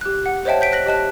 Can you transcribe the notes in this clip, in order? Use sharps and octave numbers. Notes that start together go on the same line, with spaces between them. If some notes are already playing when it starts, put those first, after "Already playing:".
G4 F#6
F#5
C5 C#5 D#5 E5 G5 A5
G6 B6 D7
F#6 A#6 B6 F#7
G4 D#5 A5 F#6